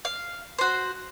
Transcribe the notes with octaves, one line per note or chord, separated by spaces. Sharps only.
F5
F#4 C5